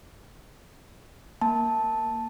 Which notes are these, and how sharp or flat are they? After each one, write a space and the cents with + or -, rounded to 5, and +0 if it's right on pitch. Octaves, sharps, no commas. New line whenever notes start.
A#3 +0 A5 +0